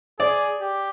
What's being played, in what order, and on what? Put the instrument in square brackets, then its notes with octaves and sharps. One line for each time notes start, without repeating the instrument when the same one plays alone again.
[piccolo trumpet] G#4 [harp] D5
[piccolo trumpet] G4